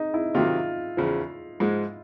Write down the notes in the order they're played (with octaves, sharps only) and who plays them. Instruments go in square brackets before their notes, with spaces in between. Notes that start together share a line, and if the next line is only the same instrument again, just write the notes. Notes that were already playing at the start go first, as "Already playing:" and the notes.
Already playing: [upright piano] D#4
E4
[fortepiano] C3 D#3 F#3 [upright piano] F4
[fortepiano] E2 C#3 F3
G#2 F3 G#3